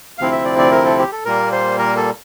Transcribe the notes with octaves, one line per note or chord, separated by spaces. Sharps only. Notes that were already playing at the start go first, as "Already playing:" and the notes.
D2 C3 F3 C4 E4 F5
E5
D5
D5
A#4
A4
G4
A4
A#2 G3 A#3 A#4
C5
A#4
A4